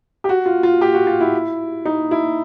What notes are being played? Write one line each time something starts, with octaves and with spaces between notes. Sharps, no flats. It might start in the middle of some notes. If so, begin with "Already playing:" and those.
G4
F#4
F4
F4
G4
F#4
F4
E4
D#4
E4